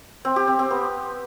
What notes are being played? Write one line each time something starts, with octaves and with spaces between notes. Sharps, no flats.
C4
G4
C4
C4
B3